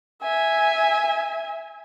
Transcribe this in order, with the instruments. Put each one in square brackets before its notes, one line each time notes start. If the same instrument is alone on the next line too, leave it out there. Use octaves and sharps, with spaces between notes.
[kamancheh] E5 G#5